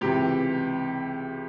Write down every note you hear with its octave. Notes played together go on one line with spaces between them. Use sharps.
C#2 C3 E3 G4